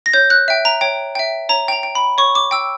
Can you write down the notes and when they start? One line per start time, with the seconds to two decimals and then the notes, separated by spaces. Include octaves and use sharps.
0.06 A#6
0.13 C#5 G6
0.30 F#6
0.48 E5 G5
0.65 A#5
0.81 C#5 G5
1.15 E5 G5
1.49 C#5 A#5
1.68 G5
1.72 A#5
1.83 G5
1.95 B5
2.18 C#5 C#6
2.35 D6
2.51 G5 E6